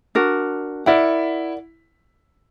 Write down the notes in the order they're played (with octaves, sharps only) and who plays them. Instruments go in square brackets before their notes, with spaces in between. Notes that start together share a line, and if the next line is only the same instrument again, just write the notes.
[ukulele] D4 F#4 A#4
[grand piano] E4 [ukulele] A#4 D5 F#5